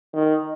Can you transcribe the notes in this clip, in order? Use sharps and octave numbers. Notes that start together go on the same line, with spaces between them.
D#3